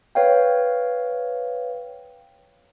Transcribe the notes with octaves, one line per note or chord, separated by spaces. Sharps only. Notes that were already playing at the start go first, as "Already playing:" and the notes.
B4 C#5 F5 G5